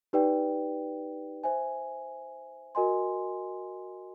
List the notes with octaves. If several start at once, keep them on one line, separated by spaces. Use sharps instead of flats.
D#4 G4 B4 D5 G5
C5 E5 G#5
F#4 A#4 D#5 G#5 C6